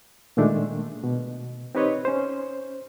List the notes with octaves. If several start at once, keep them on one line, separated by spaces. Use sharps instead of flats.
A#2 D#3 G#3 A3 D4
B2
C4 D#4 G4 B4 C#5 D#5
C#4 C5